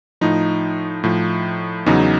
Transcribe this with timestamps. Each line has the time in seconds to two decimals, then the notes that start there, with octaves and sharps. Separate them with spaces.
0.21 A2 F3 D#4
1.04 A2 F3
1.86 E2 C#3 F#3 D#4